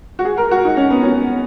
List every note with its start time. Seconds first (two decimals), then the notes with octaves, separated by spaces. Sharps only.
0.19 F#4
0.25 G#4
0.38 A#4
0.51 F#4
0.65 D#4
0.77 C#4
0.90 B3
1.03 C#4